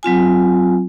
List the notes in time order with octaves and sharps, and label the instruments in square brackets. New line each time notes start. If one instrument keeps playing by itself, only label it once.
[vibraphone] F#3 C4 F4 G#5